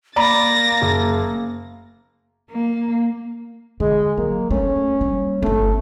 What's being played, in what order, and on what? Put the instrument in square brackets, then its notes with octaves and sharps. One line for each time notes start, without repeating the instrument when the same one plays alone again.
[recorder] A#3 [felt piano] D5 A#5 B5 [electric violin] A6 A#6
[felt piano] F#1
[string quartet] A#3
[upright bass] D3 [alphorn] G#3
[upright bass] F#3 [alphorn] A#3
[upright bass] A3 [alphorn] C#4
[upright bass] G3 A#3
[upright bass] G1 C#4 [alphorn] A3